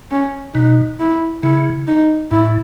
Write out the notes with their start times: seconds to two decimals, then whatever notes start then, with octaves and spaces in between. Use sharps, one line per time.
0.11 C#4
0.54 B2 D#4
1.00 E4
1.43 C#3 E4
1.87 D#4
2.31 A2 E4